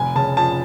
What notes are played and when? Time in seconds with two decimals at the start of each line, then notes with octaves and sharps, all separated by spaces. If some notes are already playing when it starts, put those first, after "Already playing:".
Already playing: F1 G#5
0.15 C#3 A5
0.37 F2 A5